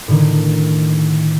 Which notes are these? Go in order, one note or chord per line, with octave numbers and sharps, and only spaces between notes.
A2 D3 D#3